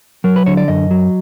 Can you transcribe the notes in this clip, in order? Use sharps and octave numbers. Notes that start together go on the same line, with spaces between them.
F#3 A#4
B4
D3 C#5
D5
F#2 D#5
F#3